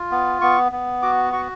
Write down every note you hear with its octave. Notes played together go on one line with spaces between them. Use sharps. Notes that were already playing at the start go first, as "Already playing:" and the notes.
Already playing: F4
B3
B3 C#6
B3
F#4 D6
F#4 C#6